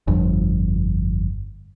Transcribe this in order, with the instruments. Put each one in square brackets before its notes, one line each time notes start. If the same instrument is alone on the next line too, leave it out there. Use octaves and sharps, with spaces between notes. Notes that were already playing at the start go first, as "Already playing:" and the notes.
[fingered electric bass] G1 F2